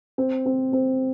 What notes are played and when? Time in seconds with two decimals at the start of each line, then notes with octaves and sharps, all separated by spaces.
0.18 C4
0.46 C4
0.73 C4